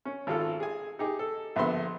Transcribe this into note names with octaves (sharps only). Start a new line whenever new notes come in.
C#4
G#1 F4 A4
G#4 G#5
D#4 G4 G#4
A4
A#1 D3 B3 E5 C6